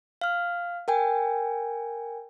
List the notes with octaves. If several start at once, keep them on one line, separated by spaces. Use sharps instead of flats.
F5 F6
A#4 G5 G#5